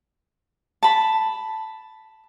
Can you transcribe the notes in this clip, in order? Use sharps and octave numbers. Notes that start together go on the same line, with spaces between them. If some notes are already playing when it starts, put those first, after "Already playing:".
A5 B5